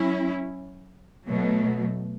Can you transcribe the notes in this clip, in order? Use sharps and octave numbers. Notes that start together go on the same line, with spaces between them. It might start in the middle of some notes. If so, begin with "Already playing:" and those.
Already playing: F#3 C#4 E4
B2 F#3 A3